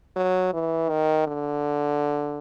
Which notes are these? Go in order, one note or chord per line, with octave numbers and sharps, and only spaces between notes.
F#3
E3
D#3
D3